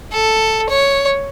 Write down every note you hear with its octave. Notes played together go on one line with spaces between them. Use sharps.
A4
C#5